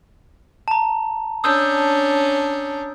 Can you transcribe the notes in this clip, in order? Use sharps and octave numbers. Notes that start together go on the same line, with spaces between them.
A5 A#5
C#4 D4 D#6 E6 G6